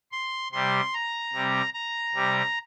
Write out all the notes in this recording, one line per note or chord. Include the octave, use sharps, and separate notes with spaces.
C6
C3 G3 C6
A#5
C3 G3
A#5
C3 G3